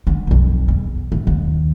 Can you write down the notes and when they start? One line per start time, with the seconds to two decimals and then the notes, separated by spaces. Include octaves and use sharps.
0.07 D3
0.27 B1 F2
0.68 E2
1.12 A2
1.27 D#2